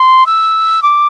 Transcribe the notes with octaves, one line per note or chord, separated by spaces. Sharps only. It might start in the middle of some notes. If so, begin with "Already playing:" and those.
Already playing: C6
E6
D6